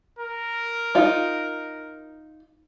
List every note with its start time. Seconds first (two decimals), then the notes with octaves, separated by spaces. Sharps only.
0.19 A#4
0.95 D#4 F4